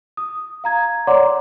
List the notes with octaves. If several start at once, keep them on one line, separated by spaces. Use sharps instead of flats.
D#6
F5 A#5 G#6
C#5 D5 F#5 A#5 C6 D6